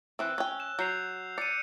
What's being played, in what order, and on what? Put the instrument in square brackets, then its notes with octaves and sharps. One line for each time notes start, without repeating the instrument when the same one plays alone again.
[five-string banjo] E3 C4 [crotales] E6 F#6
[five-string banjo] C#4 G5
[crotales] E7
[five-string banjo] F#3 [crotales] G6 C7 F7
[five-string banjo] D5 [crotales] C#7 D#7